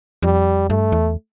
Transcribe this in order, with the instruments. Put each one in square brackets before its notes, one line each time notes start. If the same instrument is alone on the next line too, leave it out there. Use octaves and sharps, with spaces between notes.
[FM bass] F2 [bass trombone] G3
[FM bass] G2 [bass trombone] A3
[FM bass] E2